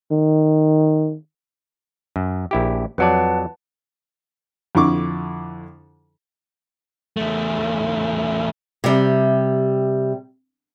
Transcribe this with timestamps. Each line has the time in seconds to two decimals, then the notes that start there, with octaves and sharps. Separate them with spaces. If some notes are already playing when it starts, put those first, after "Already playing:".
0.12 D#3
2.16 F#2
2.51 A#1 E4 G4
2.98 F2 F#3 B4 D5 F#5 A5
4.75 F2 D3 E4 C#6 D6
7.17 E2 A3
8.84 C3 G3